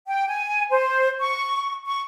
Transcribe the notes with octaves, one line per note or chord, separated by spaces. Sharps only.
G5
G#5
C5
C#6
C#6